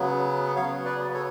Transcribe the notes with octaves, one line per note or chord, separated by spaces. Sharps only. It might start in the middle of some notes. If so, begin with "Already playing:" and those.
Already playing: C#3 F#3 B3
C#3 F#3 B3 C#5 F5
B4 D5
A4 C#5